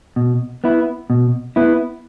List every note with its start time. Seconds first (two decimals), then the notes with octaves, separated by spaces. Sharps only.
0.16 B2
0.64 B3 E4
1.10 B2
1.56 B3 E4